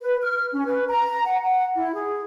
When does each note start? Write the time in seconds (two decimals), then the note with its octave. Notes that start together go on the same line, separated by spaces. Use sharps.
0.01 B4
0.22 F6
0.52 C#4
0.66 B4
0.89 A#5
1.26 F#5
1.44 F#5
1.75 E4
1.94 G#4